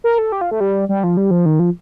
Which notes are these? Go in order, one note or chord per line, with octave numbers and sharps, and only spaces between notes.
A#4
A4
G4
F4
A3
G3
G3
F3
G3
F3
D#3
F3